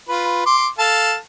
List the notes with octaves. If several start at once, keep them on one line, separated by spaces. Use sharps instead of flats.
F4 B4
C6 D6
A4 F5 A5